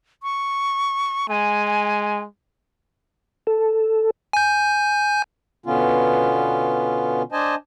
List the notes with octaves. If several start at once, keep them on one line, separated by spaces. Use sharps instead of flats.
C#6
G#3 G#5
A4
G#5 G6
B2 D3 B3 C#4 F4
D4 C5 D#5 G#5 A5